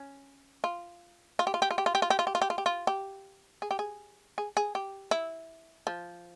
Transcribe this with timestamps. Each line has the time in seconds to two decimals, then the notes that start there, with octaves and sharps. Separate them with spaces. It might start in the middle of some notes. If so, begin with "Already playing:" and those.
Already playing: C#4
0.64 F4
1.39 F4
1.47 G4
1.54 F4
1.62 G4
1.71 F4
1.78 G4
1.86 F4
1.95 G4
2.02 F4
2.10 G4
2.19 F4
2.27 G4
2.35 F4
2.42 G4
2.50 F4
2.58 G4
2.66 F4
2.87 G4
3.62 G#4
3.71 G4
3.79 G#4
4.38 G#4
4.57 G#4
4.75 G4
5.11 E4
5.87 F3